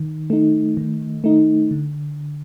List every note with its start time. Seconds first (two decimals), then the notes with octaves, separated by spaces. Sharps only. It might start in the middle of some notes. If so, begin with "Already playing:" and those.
Already playing: D#3
0.30 A3 D#4
0.77 D#3
1.24 A3 D#4
1.71 D3